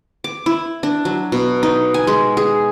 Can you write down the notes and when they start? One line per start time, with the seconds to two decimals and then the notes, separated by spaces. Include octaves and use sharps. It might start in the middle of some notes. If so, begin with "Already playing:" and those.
0.24 D6
0.46 E4
0.83 D4
1.05 F#3
1.32 B2
1.63 D#4
1.94 G#5
2.07 G#3
2.37 G#4